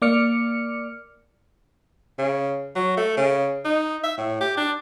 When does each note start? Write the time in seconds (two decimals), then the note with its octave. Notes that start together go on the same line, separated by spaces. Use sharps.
0.02 A#3 D5 D6 F6 C#7
2.18 C#3
2.75 F#3
2.97 A3
3.17 C#3
3.65 D#4
4.04 E5
4.18 A2
4.41 G4
4.57 D4